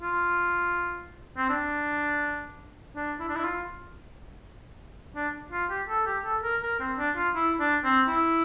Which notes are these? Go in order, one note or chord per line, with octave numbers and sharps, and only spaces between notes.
F4
C4
D4
D4
E4
D4
E4
F4
D4
F4
G4
A4
G4
A4
A#4
A#4
C4
D4
F4
E4
D4
C4
E4